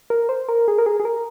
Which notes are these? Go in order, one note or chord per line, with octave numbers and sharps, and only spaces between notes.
A#4
C5
A#4
G#4
A#4
G#4
G#4
A#4